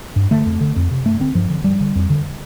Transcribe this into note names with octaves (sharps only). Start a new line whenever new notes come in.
G2
D3 A3
F2
D3
F2
C3
G2 A3
D3 C4
G2 F3
D3
G2 G3
D3
F2
D3